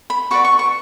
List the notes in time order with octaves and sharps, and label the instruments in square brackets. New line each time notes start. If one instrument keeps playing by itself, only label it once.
[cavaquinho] B5
F#4 B4 D5 C#6
C#6
C#6